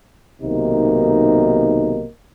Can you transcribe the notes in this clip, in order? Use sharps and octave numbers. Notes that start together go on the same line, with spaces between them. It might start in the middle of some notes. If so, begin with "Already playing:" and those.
B1 C3 D#3 A#3 D#4